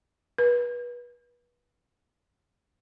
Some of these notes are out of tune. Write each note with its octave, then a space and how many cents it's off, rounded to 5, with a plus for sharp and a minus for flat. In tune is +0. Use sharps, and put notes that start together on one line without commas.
B4 -30